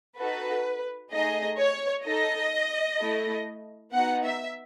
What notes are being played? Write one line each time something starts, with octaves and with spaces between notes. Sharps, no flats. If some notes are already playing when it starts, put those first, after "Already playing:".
D#4 F#4 A4 B4
A3 D#4 G#4 D#5
C#5
D#4 A4 D#5
A3 E4 A4
B3 D#4 F#4 F#5
E5